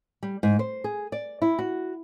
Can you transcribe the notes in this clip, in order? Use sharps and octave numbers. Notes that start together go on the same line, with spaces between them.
G3
G#2
C5
G#4
D5
E4
F#4